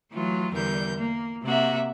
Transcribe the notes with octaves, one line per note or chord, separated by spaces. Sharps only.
E3 F#3 A3 F4
E2 D3 G3 A#4 G6
A#3
C3 A#3 F#4 E5